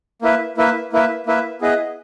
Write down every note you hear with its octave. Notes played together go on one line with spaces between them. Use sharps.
A#3 E4 B4 E5
A#3 E4 B4 E5
A#3 E4 B4 E5
A#3 E4 B4 E5
B3 E4 G#4 B4 D#5